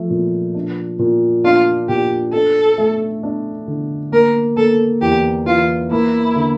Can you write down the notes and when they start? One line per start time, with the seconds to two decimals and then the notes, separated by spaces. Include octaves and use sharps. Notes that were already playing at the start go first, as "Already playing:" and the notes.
Already playing: F3 A3
0.10 A#2
0.55 D4
0.99 A#2
1.44 D4 F4
1.89 A#2 G4
2.33 D4 A4
2.78 A3
3.23 D4
3.68 D3
4.12 A#3 A#4
4.56 A#3 A4
5.02 E2 G4
5.46 E3 F4
5.91 A#3 E4
6.36 D3